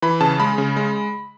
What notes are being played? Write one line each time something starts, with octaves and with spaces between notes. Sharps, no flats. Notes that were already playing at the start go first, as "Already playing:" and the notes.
E3 B5
C#3 A5
G#3 B5
C#3
G#3